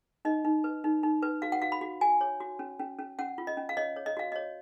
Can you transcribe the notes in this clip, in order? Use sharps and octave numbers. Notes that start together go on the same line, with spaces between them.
D#4 D#5
D#4
B4
D#4
D#4
B4
F#4 F5
F#5
F#4 F5
B5
F#4
F#4 G#5
C#5
F#4
C#4
C#4
C#4
C#4 F#5
F4
D#5
C#4
F5
C#5 D#5
C#5
D#5
F#4 F5
C#5 D#5